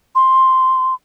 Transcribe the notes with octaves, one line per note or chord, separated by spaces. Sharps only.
C6